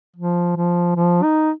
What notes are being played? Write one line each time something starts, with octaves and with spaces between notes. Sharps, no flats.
F3
F3
F3
D#4